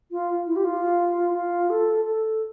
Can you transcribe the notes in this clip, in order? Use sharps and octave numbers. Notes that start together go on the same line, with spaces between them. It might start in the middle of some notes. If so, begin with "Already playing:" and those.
F4
E4
G4
F4
F4
A4
A4